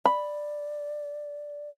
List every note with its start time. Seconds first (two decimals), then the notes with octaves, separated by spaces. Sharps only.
0.05 D5 B5